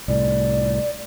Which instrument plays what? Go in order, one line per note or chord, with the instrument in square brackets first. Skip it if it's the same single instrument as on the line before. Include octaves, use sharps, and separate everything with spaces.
[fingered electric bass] C2 A2 [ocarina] D5